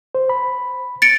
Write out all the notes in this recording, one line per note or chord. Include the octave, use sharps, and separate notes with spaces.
C5
B5
A6 C#7 D7